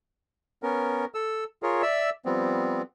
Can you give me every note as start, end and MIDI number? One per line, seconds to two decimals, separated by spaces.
0.63 1.05 59
0.63 1.05 61
0.63 1.05 70
1.15 1.44 69
1.15 1.44 88
1.63 1.82 65
1.63 1.82 68
1.63 1.82 70
1.63 1.82 73
1.82 2.10 74
1.82 2.10 76
1.82 2.10 88
2.25 2.82 53
2.25 2.82 55
2.25 2.82 59
2.25 2.82 60